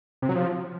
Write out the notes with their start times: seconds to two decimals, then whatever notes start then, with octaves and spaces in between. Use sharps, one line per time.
0.22 C3
0.29 F#3
0.35 F3